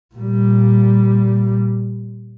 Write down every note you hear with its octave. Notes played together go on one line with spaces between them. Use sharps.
A#2 G3